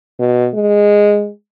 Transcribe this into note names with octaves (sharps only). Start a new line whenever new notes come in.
B2
G#3